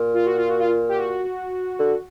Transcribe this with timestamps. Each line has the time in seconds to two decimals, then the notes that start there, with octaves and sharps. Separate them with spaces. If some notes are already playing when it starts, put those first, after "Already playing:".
Already playing: A#2
0.14 F4
0.25 F#4
0.37 F4
0.48 F#4
0.59 F4
0.89 G4
0.97 F#4
1.79 D3